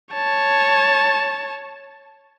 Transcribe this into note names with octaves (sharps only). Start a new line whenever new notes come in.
C#5 A5